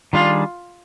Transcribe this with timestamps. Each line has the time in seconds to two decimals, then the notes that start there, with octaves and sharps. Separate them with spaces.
0.13 D#3 G3 D4 F4 G#4 D5